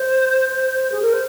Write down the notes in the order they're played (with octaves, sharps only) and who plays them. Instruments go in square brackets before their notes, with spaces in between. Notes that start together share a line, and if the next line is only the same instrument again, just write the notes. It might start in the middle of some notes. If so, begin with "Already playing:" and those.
Already playing: [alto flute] C5
G#4
A#4
C5